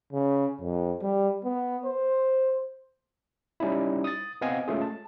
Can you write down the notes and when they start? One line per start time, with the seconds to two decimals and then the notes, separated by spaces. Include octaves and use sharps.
0.13 C#3
0.61 F2
1.02 G3
1.44 B3
1.85 C5
3.60 G3 C#4 D#4 E4
4.04 D#6 A6
4.41 B3 C4 D#5 F5 G#5
4.68 G#3 A3 C#4 F4 G#4
4.82 A5